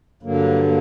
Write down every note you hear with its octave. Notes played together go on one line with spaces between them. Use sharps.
G2 D3 F#3 A#3
A#3